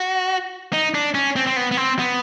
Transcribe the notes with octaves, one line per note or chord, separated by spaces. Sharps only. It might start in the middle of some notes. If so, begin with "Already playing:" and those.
Already playing: F#4
D#4
D4
C#4
C4
C4
B3
B3
C4
B3